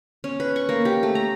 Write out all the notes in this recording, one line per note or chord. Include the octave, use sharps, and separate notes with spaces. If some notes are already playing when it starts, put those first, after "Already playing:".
C#4
B4
C#6
A#3
G4
A3
A#5